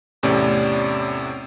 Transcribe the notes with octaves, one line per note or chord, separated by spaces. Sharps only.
E2 A2 C3 C#4 D5